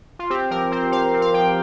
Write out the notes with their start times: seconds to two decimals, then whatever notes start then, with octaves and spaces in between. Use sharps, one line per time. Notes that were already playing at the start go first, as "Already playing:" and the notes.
0.19 F4
0.30 C4 G4
0.51 F3 A#4
0.72 C4 C5
0.92 F3 F5
1.14 C4
1.22 F5
1.34 F3 G5